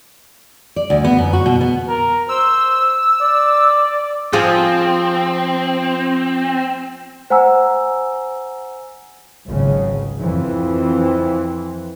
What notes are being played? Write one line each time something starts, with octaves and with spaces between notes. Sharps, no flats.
D5
D2
B3
F#2
F#4
B2
B3
A#4
C5 E6
D5
F3 C4 F4 G#4
C5 F#5 G#5 A#5 E6
G#1 C#2 C#3 F#3
F2 E3 F3 C4